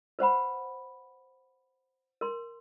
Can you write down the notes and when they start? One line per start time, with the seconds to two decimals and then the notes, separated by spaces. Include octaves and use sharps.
0.19 B4 C5 F#5 B5
2.21 A#4 C6